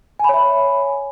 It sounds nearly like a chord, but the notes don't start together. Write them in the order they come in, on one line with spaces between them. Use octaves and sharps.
G#5 B5 C#5 E5